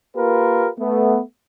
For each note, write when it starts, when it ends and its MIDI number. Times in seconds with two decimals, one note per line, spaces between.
0.16 0.68 58
0.16 0.68 65
0.16 0.68 67
0.16 0.68 70
0.16 0.68 71
0.79 1.20 57
0.79 1.20 59